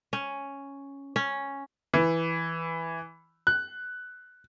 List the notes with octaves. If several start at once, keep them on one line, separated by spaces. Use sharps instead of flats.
C#4
C#4
E3
F#6